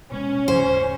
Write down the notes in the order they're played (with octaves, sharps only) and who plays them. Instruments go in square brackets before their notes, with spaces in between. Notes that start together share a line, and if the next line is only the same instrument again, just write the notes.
[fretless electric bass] B2 G#3 [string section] C#4
[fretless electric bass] D#1 G#2 C#3 [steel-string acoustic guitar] C5